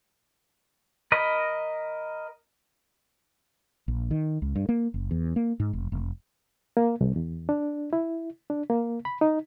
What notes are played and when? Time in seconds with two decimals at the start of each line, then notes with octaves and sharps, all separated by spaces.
1.12 A#4 D#5 B5
3.88 A#1
4.11 D#3
4.42 C#2
4.56 G2
4.69 A#3
4.94 F#1
5.11 E2
5.36 A#3
5.60 G#2
5.73 F1
5.92 F1
6.77 A#3
7.01 C2
7.16 E2
7.49 D4
7.93 E4
8.50 D4
8.70 A#3
9.05 B5
9.21 D#4